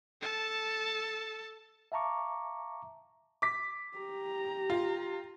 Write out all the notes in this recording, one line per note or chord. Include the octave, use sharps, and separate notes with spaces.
A4 A5
E5 F5 A5 A#5 C#6 D6
D6 B6
G4 A#5
F4